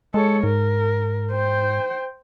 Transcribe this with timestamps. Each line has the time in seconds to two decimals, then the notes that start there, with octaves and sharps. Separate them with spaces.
0.14 G#3 A4 C#5
0.43 G#2 A#4
1.32 C5 G5